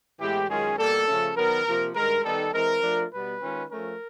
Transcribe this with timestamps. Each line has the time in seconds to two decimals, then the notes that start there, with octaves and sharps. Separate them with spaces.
0.20 A2 E3 G#3 B3 G4
0.49 F#2 D#3 G#3 C#4 F4 G#4
0.78 B2 G3 A#3 A4
1.08 C#3 F3 A3 C#4
1.36 D#3 F#3 B3 A#4
1.67 C3 F3 A#3
1.95 G2 D#3 G#3 A#4
2.24 D#3 G3 B3 D#4 A4
2.53 E3 G#3 C4 A#4
2.82 F3 A3 D4 F4
3.12 B2 G3 B3 B4
3.41 D#3 G#3 C#4 F4
3.70 F3 A3 C#4 A#4